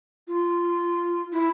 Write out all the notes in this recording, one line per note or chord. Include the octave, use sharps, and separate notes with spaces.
F4
E4